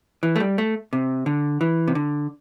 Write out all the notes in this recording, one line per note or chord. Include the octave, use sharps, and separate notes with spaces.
E3
A3
G3
A3
C3
D3
E3
C3
D3